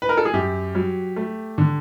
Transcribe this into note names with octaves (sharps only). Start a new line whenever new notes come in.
B4
A#4
A4
G#4
F#2 G4
F#3
A3
D3